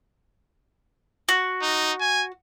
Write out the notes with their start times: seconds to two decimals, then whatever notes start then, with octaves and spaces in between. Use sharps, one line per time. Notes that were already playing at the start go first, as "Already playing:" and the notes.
1.29 F#4
1.62 D#4
2.00 G#5